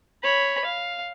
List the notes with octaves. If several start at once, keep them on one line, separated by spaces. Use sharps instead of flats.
C#5 B5
F5